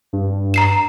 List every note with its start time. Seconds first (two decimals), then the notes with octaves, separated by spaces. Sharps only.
0.13 G2
0.54 A#5 C7 E7